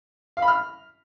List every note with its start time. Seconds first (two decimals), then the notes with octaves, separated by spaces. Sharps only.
0.37 F5
0.42 B5
0.48 F6